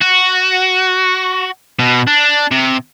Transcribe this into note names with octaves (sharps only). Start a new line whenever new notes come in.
F#4
B2
D4
C3